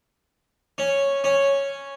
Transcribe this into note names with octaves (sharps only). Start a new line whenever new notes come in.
C#4
C#4